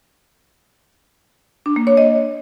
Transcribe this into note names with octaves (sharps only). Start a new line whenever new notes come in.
D4
A#3
C#5
D#5